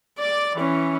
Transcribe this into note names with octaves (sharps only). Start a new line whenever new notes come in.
D5 D6
E3 C#4